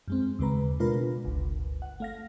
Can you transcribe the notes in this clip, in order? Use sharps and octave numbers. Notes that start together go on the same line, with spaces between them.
F#2 G#3 C4
D#2 C#3 G#3 B4 A#5
B2 G#3 D4 F4 A#4 B4
G1 C#2
F#5
A3 F5 A#6